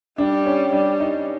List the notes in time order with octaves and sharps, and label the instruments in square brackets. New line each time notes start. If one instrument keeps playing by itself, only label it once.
[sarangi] G3 [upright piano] D4
[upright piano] C#4
[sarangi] G3 [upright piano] D4
[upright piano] D#4